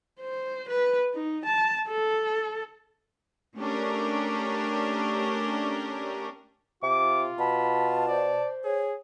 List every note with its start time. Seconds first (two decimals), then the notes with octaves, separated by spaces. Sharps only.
0.20 C5
0.69 B4
1.14 D#4
1.46 A5
1.89 A4
3.58 A3 C#4 D4 G4 A#4
6.83 C3 F4 D6
7.39 B2 A5 B5
8.08 C5 D5
8.64 G#4 C#5